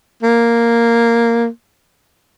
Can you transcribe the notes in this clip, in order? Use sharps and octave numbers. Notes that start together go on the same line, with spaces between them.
A#3